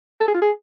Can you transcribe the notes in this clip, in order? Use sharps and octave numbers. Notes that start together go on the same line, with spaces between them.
A4
G#4
F4
G#4